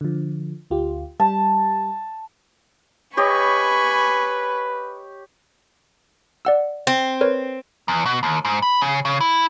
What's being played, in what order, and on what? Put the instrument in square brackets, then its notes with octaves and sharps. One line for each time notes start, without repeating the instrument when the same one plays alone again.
[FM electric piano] D3 F3
D2 F4 G4
[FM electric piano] G3 [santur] A5
[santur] G4 C#5 D#5 [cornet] B4 [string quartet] G#5 B5 C#6
[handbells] D5 F#5 E6
[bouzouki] C4
[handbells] A#4 B4 C#5
[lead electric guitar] E2
B2
D#2
G#2
B5
C#3
C#3
E4